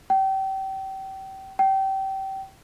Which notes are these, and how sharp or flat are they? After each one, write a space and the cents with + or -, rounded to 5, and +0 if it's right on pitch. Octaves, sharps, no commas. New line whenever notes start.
G5 -30
G5 -25